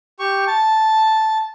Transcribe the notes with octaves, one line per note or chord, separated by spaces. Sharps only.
G4 C#6
A5